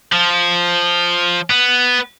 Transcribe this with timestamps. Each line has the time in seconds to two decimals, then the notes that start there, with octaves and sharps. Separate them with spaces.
0.13 F3
1.50 B3